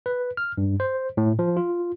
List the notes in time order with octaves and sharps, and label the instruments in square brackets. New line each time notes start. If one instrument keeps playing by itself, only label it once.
[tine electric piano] B4
F6
G2
C5
A2
F3
F4